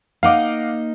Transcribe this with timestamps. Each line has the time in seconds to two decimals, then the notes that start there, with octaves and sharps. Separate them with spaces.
0.23 A#3 D#4 D#5 F5 F#5 D6